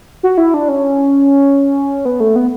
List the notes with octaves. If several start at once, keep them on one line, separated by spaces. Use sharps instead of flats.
F#4
E4
D4
C#4
B3
A3
B3